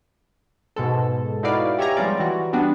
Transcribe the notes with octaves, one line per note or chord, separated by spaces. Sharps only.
G#2 B2 G#3 A4
D#4 E4 F#4 B4 D5 F5
G4 C#5 E5 G#5 A#5
F3 G3 G#3 B3 F4 D5
E3 F#4
G3 B3 D4 F#4